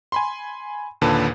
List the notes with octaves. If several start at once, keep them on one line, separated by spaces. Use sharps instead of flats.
G#5 B5 C6
D#2 A#2 D3 A4 B4 A5